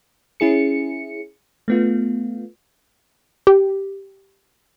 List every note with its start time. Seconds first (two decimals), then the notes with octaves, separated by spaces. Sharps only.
0.40 C#4 E4 G#4 C#7
1.68 A3 B3 F4
3.47 G4